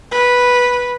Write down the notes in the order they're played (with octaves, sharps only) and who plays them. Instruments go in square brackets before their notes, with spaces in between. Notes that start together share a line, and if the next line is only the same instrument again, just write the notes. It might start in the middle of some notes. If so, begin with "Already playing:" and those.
[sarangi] B4